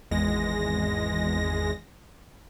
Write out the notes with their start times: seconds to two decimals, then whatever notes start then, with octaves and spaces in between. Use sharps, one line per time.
0.11 G#1 E2 G#3 A#6